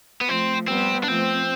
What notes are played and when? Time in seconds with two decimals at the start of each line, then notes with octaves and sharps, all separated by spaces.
0.21 B3
0.28 F3 A3 C4
0.68 G3 B3 C4
1.04 D4
1.08 F3 A3 C4